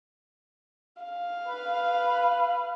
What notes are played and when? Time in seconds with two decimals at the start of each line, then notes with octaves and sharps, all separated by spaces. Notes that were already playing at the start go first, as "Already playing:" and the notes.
1.02 F5
1.48 B4